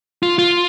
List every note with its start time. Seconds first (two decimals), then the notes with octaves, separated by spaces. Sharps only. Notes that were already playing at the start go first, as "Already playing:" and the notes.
0.23 F4
0.39 F4